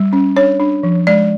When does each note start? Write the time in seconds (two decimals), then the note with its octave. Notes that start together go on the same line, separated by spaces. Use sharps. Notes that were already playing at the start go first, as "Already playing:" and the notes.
Already playing: G3
0.13 C#4
0.36 D4 C#5
0.60 D4
0.83 F3
1.07 G#3 D5